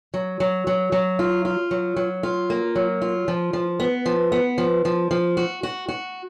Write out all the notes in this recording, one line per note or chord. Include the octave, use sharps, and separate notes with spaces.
F#3
F#3
F#3
F#3
F4
F4
F#3
F#3
F4
A#3
F#3
F4
F3
F3
B3
F3
B3
F3
F3
F3
F#4
F#4
F#4